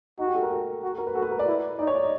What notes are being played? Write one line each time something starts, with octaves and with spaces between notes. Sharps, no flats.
D#4 F#4
G4
A4
A#4
A4
F#4
A4
A#4
B4
F#4 A4
B4
A#4
D5
E4
D#4 D5
C#5
D5
D#5